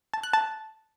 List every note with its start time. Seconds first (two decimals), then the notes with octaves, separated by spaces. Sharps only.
0.13 A5
0.23 F#6
0.33 A5